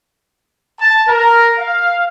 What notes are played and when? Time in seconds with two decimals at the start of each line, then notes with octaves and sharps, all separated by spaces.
0.79 A5
1.08 A#4
1.59 F5